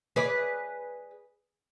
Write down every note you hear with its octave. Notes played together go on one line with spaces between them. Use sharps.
G#4 B4 D5